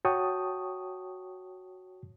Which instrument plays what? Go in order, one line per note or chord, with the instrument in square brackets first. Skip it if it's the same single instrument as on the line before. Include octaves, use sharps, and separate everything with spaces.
[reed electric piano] F#4 C#5 G5 A5 C#6 D#6